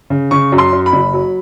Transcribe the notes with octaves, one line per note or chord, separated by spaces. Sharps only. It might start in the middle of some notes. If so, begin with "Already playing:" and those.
C#3
C#3 C#6
F#2
C6
F#2
B5
F#1
F#3